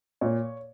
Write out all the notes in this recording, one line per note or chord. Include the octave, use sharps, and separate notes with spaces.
A#2 C#5